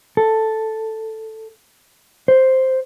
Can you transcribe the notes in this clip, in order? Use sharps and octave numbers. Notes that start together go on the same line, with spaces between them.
A4
C5